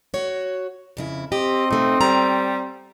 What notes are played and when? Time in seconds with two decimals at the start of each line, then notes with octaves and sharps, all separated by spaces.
0.14 F#4 C#5
0.97 F2 C#3 E4
1.32 C4 G4 D#5
1.71 B2 A3 D#4
2.01 G3 A#5